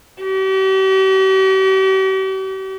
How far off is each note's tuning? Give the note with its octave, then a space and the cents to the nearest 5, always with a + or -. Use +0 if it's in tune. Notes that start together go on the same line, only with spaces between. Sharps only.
G4 -45